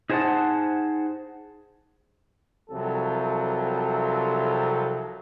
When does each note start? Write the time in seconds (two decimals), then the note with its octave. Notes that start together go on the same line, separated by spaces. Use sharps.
0.10 D#4 G#4 C5 D5 F#5 A5
2.70 C2 C3 F3 F#3 A4